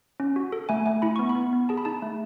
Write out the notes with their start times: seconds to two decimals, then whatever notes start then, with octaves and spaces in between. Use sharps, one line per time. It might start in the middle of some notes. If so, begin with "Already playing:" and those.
0.20 C#4
0.36 F#4
0.52 A4
0.69 A3 G#5
0.86 A3 G#5
1.02 E4 B5
1.16 B3 C#6
1.29 B5
1.35 B3
1.53 B3
1.69 G#4 A5
1.78 B5
1.85 D#4 A5
2.02 A3